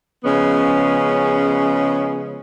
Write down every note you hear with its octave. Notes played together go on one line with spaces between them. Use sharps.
C#3 F3 G#3 B3 C#4